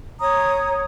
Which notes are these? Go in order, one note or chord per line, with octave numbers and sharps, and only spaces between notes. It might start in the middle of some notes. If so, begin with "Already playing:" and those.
C#5 A#5 D#6